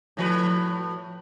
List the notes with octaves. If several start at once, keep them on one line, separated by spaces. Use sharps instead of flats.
A2 F3 B4